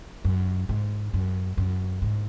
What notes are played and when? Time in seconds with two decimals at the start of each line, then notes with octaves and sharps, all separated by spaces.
0.25 F#2
0.69 G#2
1.14 F#2
1.57 F#2
2.02 G#2